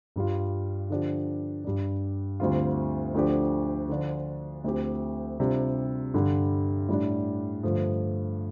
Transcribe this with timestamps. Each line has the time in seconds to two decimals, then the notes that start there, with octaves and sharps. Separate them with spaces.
0.16 G2 G3 F4
0.90 D3 F3 D4 G4
1.64 G2 G3 D4
2.40 D2 D3 G3 C4 F4
3.14 D2 D3 F3 D4 G4
3.89 D3 F3 D4 F4
4.64 D2 D3 F3 C4 G4
5.40 C3 G3 D4 F4
6.14 G2 D3 G3
6.88 A2 G3 D4
7.63 G2 D3 F3 A3